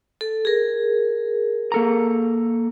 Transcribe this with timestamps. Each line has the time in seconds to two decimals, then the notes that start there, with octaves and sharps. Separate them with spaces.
0.21 A4
0.45 G#4 A#4
1.72 A#3 A4 A#5